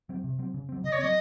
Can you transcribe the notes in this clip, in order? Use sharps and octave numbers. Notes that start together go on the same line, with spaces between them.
F#3 C4
C3
F#3 C4
C#3
F#3 C4
C#3 D#5
C#5
F#3 C4 D#5